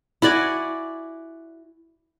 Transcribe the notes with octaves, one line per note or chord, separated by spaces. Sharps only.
E4 F#4 D5 G#5